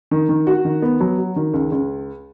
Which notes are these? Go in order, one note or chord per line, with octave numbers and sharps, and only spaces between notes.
D#3
D#3
F#4
D#3
B3
F#3
F#4
D#3
C#2
C#2